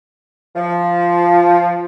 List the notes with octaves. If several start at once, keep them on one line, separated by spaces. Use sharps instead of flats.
F3